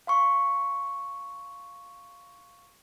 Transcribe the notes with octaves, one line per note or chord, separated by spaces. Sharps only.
F5 C6 C#6